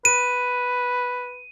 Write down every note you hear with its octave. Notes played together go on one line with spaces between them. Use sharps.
B4 D#7